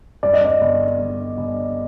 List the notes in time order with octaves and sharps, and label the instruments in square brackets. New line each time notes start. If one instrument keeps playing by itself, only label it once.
[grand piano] G2 [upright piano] D5
[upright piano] D#5
D5
[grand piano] G1
G1
G1